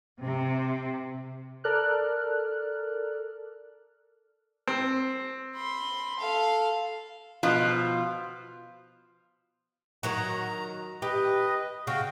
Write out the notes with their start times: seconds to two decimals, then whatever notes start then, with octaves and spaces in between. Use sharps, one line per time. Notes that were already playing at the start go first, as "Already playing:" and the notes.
0.21 C3
1.64 A4 A#4 D5 F6 F#6
4.67 C4
5.57 B5 C6
6.20 A4 F5
7.43 B2 F3 F4
10.03 D#3 F#3 F#4 A#5
11.02 G4 B4 D#5
11.87 C#3 F#4 F5 G5